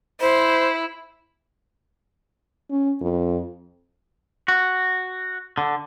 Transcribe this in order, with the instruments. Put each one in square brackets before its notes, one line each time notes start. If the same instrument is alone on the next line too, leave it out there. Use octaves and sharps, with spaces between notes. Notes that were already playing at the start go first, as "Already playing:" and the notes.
[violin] E4 [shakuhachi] C5
[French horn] C#4
F2
[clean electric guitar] F#4
D3